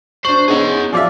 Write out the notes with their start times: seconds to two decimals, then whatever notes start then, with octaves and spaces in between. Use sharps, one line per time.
0.25 D4 C5 C#6 F#7
0.48 B3 C#4 D#4 G#4 F#5
0.93 F3 F4 D5 E5 D6 A6